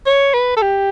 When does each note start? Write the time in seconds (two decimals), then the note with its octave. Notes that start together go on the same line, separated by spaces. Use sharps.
0.06 C#5
0.34 B4
0.56 A4
0.62 G4